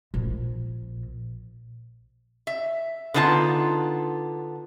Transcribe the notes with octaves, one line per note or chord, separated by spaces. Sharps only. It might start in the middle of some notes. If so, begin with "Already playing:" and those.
A#1
E5
D3 B3 D#4 F4 A5